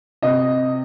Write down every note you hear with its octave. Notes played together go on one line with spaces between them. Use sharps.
C3 D#5